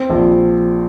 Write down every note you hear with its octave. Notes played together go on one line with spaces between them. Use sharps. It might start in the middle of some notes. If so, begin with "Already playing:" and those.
Already playing: C4
A#1